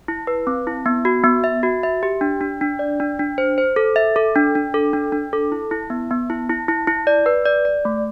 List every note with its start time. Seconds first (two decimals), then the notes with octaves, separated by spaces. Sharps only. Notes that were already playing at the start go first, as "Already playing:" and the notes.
0.08 E4
0.27 B4
0.47 C4
0.67 E4
0.86 B3
1.05 F#4
1.24 B3
1.44 E5
1.63 F#4
1.83 E5
2.03 G4
2.21 D4
2.41 D4
2.61 D4
2.79 D5
3.00 D4
3.19 D4
3.38 C5
3.58 C5
3.76 A4
3.96 E5
4.16 A4
4.36 D4
4.55 D4
4.74 A4
4.93 D4
5.12 D4
5.33 A4
5.52 E4
5.71 E4
5.90 B3
6.11 B3
6.30 E4
6.49 E4
6.68 E4
6.87 E4
7.07 D5
7.26 B4
7.45 D5
7.65 D5
7.85 A3